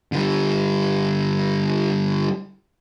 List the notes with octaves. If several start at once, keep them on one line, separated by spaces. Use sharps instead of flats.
D3 G3